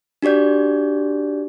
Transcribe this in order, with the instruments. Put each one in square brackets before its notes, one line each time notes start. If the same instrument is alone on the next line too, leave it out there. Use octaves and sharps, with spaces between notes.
[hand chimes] D4 F#4 G4 D5 G6